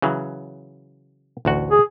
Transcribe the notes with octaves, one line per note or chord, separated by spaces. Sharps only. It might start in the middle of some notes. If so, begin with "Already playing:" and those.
C#3 E3 F#3
A1 D2 F#4
G#4